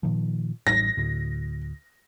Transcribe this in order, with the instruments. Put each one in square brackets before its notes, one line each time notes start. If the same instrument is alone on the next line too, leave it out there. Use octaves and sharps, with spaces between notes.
[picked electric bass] A#2 D#3 F3
[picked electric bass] A1 G3 [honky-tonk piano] A#6
[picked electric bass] D2 A2